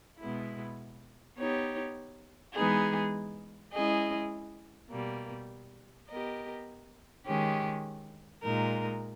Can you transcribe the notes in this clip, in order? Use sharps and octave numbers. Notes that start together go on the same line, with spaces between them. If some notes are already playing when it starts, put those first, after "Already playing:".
B2 G#3 B3 E4
B3 D#4 G4 C#5
E3 G#3 B3 D#4 G#4
G#3 C#4 E4 G#4 D#5
B2 G3 A#3
B3 G4 A#4 D#5
D#3 G#3 C#4 G4
A#2 G#3 D#4 A#4